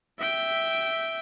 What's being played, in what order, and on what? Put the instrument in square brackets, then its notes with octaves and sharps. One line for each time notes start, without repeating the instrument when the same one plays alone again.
[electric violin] E5 G5